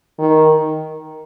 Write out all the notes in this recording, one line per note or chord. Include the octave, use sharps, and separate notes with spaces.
D#3